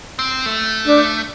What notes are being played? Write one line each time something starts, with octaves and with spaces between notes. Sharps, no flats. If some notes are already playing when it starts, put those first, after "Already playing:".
C4
A3
D4